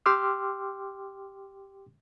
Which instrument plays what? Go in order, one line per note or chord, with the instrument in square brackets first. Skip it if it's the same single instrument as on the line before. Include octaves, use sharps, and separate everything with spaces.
[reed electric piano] G4 G5 C6 D6 E6 F6